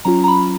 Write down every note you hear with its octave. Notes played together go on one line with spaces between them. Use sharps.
F#3 C#4 F4 A#5
A#5
B5